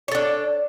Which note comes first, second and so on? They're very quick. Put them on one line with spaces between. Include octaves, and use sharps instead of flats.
C#5 A4 D4